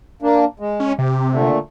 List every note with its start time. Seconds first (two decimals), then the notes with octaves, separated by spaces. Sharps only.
0.22 A#3 D4
0.60 G#3
0.80 C#4
0.98 C3 G4
1.32 A#2 D3 A3